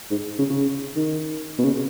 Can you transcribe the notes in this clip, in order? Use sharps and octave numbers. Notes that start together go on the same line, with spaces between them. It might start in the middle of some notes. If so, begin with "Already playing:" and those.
G#2
C#3
C#3
D#3
B2
C#3